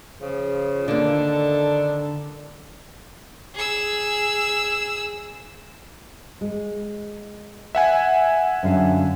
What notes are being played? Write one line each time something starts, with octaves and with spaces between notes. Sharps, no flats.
C#3 F3
D3 D#3 A#3 D4 A4
G#4 E6
G#3
E5 F#5 G#5
F#2 D3 F5